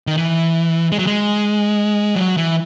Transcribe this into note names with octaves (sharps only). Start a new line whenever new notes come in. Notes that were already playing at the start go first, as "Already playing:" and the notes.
D#3
E3
G#3
F#3
G#3
F#3
E3